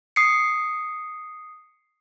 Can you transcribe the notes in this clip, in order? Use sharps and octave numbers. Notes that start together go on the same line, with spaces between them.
D#6 C7 C#7